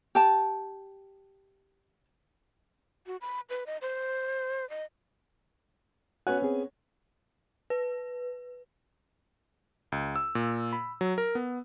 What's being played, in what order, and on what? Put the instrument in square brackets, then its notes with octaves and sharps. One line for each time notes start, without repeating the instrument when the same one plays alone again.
[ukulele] G4 A5
[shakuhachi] F#4
B5
B4
D#5
C5
D#5
[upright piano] B3 C#4 G#5 [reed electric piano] F#4 F#5 F#6
[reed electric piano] C4 G#4
[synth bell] B4
[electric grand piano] C#2
E6
A#2
B5
F#3
A#4
B3